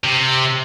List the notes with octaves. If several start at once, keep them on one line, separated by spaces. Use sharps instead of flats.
C3